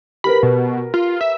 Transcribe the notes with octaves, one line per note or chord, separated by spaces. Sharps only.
G4 A#4 B4 B5
B2
F4
E5